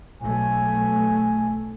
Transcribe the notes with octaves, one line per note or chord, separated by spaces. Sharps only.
B1 A3 G#5